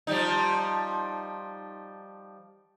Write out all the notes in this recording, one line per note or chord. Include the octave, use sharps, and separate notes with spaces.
F3 G3 D#4